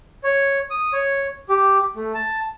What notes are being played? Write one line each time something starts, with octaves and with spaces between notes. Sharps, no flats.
C#5
D#6
C#5
G4
A3
A5